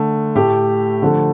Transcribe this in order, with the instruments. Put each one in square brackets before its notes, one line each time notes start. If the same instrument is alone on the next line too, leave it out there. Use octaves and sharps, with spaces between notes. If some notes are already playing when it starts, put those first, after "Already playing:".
Already playing: [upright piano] D3 A3
A2 A3 G4
D3 F3 A3